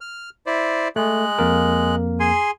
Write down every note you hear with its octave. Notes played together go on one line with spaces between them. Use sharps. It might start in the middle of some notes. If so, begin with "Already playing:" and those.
F6
E4 C5 D5
G#3 A3 F#6
F2 A#3 A#4
G#4 G#5 C6